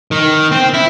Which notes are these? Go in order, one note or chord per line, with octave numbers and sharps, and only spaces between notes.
D#3
C4
E4